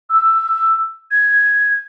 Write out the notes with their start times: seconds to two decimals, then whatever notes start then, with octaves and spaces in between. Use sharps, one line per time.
0.10 E6
1.11 G#6